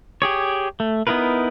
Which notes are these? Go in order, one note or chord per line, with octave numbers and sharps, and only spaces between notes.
G4 G#4 C#5
A3
B3 D#4 E4 A#4 B4